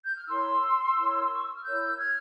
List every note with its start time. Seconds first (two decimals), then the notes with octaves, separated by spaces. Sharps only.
0.05 G6
0.16 F6
0.27 E4 A#4 C#5 C6 E6
0.95 E4 A#4 C#5
1.23 C6
1.34 C#6
1.44 E6
1.54 F6
1.64 E4 A#4 C#5 E6 G6
1.98 F6 G#6